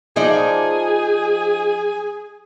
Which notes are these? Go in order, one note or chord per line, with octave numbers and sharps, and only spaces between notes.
F3 D#4 G#4 D5